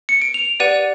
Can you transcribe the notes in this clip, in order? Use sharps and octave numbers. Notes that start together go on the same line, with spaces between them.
C#7
D7
F7
G4 B4 D5 F#5 D#7